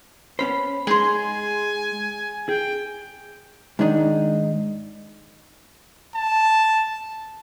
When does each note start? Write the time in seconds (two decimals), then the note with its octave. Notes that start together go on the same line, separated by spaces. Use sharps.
0.39 B3 C#4 C5 B5
0.87 G#3 D#4 G#4 G#5 C6
2.49 G#4 G5
3.79 G#2 D#3 D4 D#4
6.14 A5